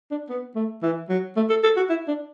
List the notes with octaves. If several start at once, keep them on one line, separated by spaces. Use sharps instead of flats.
D4
B3
A3
E3
F#3
A3
A4
A4
F#4
E4
D4